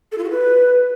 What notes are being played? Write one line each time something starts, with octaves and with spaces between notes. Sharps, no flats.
A4
F4
F#4
B4